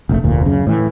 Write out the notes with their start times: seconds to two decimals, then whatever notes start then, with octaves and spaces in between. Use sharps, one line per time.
0.09 F1 A#1 A3
0.23 F1 D2 A#2
0.45 F#2 C#3
0.67 A2 E3